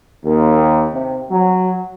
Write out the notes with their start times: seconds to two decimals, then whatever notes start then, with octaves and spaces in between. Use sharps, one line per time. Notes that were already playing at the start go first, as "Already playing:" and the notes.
0.24 D#2
0.92 C3
1.30 F#3